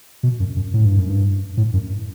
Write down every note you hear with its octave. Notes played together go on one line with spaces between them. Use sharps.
B2
F#2
F#2
A2
G2
F#2
G2
A2
F#2